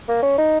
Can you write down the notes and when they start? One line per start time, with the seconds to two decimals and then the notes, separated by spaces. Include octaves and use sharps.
0.08 A#3
0.23 C#4
0.38 D#4